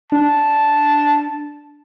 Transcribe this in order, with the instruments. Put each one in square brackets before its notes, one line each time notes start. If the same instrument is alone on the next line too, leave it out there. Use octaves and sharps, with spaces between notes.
[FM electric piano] D4 [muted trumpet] A5